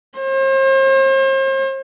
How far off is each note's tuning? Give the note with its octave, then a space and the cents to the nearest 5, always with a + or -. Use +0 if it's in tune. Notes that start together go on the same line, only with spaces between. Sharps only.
C5 +40